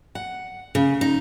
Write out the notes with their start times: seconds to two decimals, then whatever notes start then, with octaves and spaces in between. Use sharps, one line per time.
0.15 F#5
0.75 C#3
1.01 D#4